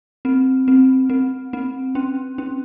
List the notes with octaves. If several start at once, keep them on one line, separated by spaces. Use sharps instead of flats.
C4
C4
C4
C4
C#4
C#4